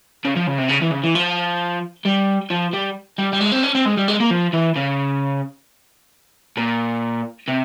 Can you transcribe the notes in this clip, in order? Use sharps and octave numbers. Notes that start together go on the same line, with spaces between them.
C#3
F3
C#3
C3
C#3
E3
C#3
E3
F3
G3
F3
G3
G3
G3
G#3
C4
C#4
C4
G#3
G3
G#3
A#3
F3
E3
C#3
A#2
C3